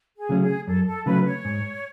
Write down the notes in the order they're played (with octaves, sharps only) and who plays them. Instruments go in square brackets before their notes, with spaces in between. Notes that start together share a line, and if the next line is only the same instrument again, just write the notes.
[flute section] G#4
[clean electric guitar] C#3 F#3 A3 C#4
[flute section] G#4
[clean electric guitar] F#2 [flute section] A4
[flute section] A4
[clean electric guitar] C#3 F#3 A3 C#4 [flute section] B4
[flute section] C#5
[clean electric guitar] G#2